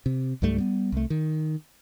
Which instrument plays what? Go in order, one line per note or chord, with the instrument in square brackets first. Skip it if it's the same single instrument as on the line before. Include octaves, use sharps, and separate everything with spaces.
[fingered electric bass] C3
C#2 G#2 G3 A3
G3 B3
C2 A3
D#3